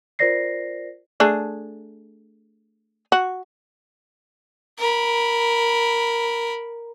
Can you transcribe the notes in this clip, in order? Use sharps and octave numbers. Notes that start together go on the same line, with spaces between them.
F4 A#4 C5 D5 A#6 C7
A3 D4 G#4
F#4
A#4 B5